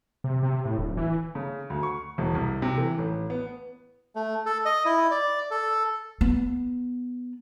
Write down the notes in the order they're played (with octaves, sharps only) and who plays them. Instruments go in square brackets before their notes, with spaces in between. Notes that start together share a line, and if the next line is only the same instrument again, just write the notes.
[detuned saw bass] C3
C3
A2
D1
E3
[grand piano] C#3
D2
C#6
E1
C2
C3
E3
A1
B3
[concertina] A3
A4
D#5
E4
D5
A4
[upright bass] B3